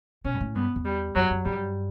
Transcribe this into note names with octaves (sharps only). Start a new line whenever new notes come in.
B2 C#4
G2
A2
G2 B3
E2
G3
F#2 F#3
F#2
G2 G3